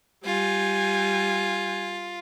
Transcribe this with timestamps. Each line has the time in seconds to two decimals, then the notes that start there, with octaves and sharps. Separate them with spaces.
0.25 G3 F4 G#5